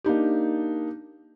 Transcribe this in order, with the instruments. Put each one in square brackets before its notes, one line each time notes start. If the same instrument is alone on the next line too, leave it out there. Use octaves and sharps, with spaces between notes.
[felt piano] A#3 D4 D#4 G4